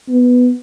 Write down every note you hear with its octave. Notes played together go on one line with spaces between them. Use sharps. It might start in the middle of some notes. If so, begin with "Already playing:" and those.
B3